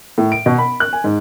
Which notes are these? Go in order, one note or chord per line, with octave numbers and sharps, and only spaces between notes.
A2
D7
B2
B5
F#6
G#5
G#2